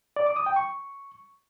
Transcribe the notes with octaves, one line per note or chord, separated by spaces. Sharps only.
D5
D6
D#6
G5
C#6